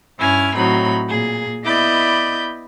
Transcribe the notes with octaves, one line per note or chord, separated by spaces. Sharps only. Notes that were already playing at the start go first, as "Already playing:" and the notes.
G2 C#4 E4 G#5 F6
A2 F#3 C4 D#4 B5
A#2 G#4
B3 E4 D5 D#5 B5 G6